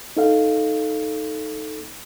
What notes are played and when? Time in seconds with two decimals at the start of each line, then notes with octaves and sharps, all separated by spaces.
0.17 D#4 A4 F5